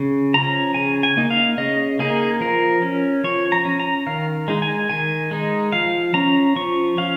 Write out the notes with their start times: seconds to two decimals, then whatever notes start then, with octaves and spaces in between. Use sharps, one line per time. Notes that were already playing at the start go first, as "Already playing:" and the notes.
Already playing: C#3
0.34 F3 C#4 A#5
0.74 C#3 G#5
1.03 G#5
1.17 A#3 D#4
1.30 F5
1.58 C#3 D#5
1.99 A#3 D#4 G#4
2.40 F3 A#4
2.82 C#4
3.24 F3 C#5
3.52 A#5
3.65 C#4
3.80 A#5
4.07 D#3 F5
4.48 G#3 D#4
4.62 G#5
4.89 D#3 G#5
5.31 G#3 D#4
5.72 F3 F5
6.14 C#4 A#5
6.56 F3 C#6
6.97 C#4 F5